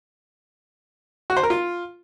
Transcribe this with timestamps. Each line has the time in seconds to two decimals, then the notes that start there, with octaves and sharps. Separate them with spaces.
1.30 F#4
1.37 C5
1.43 A#4
1.50 F4